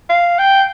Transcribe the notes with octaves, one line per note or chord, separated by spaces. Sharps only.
F5
G5